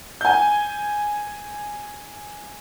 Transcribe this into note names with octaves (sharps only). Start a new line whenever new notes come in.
G#5 G6